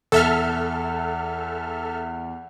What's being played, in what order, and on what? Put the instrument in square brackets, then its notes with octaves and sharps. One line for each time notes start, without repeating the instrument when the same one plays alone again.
[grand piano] E2 [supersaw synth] A4 E5 F6